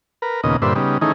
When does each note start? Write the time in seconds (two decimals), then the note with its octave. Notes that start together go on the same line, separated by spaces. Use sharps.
0.22 A#4 B4
0.44 D#2 A#2 C#3 B3 D#5
0.62 G2 A#2 D3 B4 C5 E5
0.76 C#3 G3 B3 D#4
1.01 D#3 E3 A3 C#4 D#4 G#4